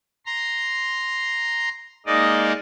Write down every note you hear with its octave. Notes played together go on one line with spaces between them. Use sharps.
A#5 C6
G#3 A#3 D#4 D5 D#5